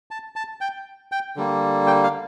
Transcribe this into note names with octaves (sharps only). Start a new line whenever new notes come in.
A5
A5
G5
G5
D3 G3 A#3
G5
F5